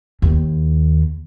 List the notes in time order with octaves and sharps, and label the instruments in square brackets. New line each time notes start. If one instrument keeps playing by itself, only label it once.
[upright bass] D#2